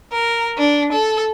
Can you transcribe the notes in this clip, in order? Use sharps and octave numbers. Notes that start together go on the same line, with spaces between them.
A#4
D4
A4